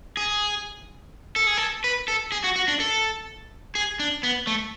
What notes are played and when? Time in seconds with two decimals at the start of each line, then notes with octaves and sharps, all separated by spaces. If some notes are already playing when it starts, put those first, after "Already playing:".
0.17 G#4
1.36 A4
1.47 G#4
1.57 A4
1.84 B4
2.08 A4
2.32 G#4
2.44 F#4
2.56 F#4
2.68 D4
2.80 A4
3.75 G#4
3.99 D4
4.23 B3
4.47 A3